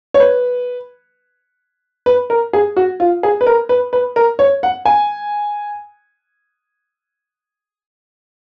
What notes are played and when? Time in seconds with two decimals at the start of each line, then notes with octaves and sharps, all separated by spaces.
0.14 C#5
0.20 B4
2.06 B4
2.30 A#4
2.53 G#4
2.77 F#4
3.00 F4
3.23 G#4
3.41 B4
3.46 A#4
3.69 B4
3.93 B4
4.16 A#4
4.39 C#5
4.63 F#5
4.85 G#5